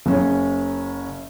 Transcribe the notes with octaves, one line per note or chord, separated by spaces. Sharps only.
F#1 C#4